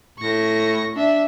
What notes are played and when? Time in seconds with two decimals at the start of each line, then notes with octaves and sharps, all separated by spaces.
0.19 A2 C#6 A#6
0.95 D4 E5